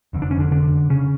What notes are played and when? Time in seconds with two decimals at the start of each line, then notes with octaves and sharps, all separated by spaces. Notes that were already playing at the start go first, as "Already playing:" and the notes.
0.13 F1 F2 D3
0.22 D4
0.31 C#4
0.39 D3 D4
0.51 D3 D4
0.90 C#3 C#4